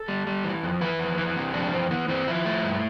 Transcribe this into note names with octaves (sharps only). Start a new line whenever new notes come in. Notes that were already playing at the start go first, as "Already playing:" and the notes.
Already playing: A4
G3
G3
E3
F2
E3 B4
F2
E3
C3
F2 D4
E3 C4
E3 B3
E3 C4
F3 E4
A3
G2